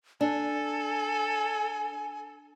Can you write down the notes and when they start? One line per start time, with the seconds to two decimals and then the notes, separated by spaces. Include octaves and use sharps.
0.21 D4 A4 G#5